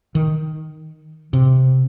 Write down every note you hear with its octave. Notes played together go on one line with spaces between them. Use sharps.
D#3
C3